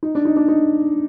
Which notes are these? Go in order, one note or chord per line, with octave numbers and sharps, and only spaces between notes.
D#4
D4
D#4
D4
D#4